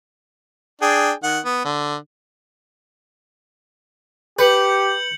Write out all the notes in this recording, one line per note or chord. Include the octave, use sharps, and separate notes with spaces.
D4 G#4 G5
D#3 F#5
B3
D3
G4 B4 G6 C#7 F#7